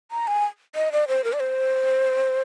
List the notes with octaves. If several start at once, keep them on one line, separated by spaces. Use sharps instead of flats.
A#5
G#5
D#5
D5
C5
A#4
D5
C5